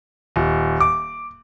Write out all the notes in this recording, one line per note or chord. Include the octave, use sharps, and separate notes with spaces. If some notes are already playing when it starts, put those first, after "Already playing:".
D#1
D6